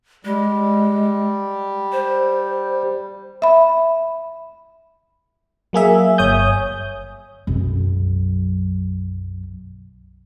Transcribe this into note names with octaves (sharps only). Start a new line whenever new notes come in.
G3 G#3
C5
E5 B5
F#3 A#3 G#4 E5
G1 C#5 G#5 D#6 G6
B1 F#2